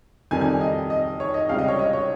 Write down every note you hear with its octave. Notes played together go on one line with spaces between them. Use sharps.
F2 D#3 G3 G#5
G#5
D#5
D#5
C#5
D#5
C#2 C3 G3 F5
D#5
C#5
D#5
C#5